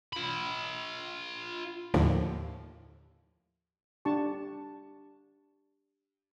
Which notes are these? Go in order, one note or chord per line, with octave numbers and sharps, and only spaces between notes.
F4 B5
D#2 A2 D3 F3
D4 G4 A5 C#6